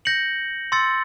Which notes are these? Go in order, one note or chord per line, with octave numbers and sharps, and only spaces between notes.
G6 A#6 C#7 F#7
C6 E6 A6 C#7